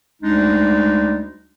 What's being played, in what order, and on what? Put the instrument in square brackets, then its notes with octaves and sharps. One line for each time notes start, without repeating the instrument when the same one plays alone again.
[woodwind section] D2 G3 G#3 D4 D#4